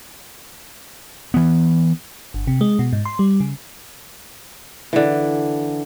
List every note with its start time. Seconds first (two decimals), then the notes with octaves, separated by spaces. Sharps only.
1.34 E3 B3
2.34 G1
2.47 C3
2.61 G#3
2.79 B2
2.93 G#2
3.05 C6
3.19 G3
3.40 C#3
4.93 D3 E3